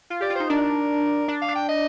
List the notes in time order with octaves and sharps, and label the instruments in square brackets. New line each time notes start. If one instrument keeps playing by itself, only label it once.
[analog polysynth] F4
[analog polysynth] G4 [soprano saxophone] D5
[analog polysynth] F4
[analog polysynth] D#4 [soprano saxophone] C5
[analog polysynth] D4 [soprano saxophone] A#4
[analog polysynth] D4
[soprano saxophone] F5
[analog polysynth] D4
[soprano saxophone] G5
D#5